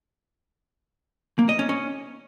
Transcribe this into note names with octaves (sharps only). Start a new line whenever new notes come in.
A#3
D#5
C#4
C#4